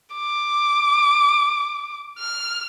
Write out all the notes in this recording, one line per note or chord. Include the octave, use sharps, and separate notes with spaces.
D6
F6